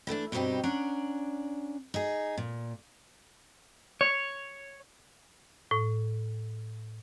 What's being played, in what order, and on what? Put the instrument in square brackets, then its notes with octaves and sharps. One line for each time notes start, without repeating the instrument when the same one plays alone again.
[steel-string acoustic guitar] E3 A3 B3 D4
G2 B2 G3 C4 D#4 G4
C#4 D4 F#5 A#5
D#4 G#4
A#2
[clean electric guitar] C#5
[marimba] A2